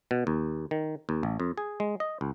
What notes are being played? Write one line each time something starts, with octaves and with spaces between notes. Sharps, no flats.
B2
D#2
D#3
D#2
A1
F2
G#4
G#3
D#5
C#2